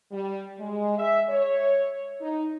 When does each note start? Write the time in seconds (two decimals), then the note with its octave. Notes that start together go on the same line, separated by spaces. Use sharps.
0.12 G3
0.59 G#3
0.99 E5
1.29 C#5
2.21 D#4